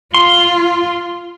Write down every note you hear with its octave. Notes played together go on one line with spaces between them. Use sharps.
F4 C6